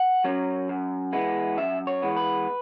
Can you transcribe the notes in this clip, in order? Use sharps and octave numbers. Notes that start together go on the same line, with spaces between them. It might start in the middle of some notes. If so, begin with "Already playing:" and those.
Already playing: F#5
F#3 C#4
F#2
E3 G#3 B3
F#2 E5
C#5
E3 G#3 B3
B4